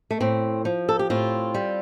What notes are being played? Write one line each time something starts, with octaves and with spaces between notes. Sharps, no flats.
A3
A2 C4
F3
A4
G4
A2 C4 F4
G3